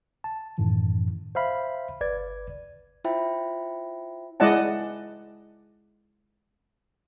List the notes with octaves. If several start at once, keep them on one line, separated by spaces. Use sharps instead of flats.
A5
F#2 A2 D#3 E3
C5 E5 F5 B5
G1 B4 D5 G#6
E4 F4 C5 E5 G5 B5
G#3 E4 D5 D#5 F#5 A5